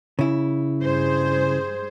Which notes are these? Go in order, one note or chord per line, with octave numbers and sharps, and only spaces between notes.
C#3 E4
G2 G#4 C5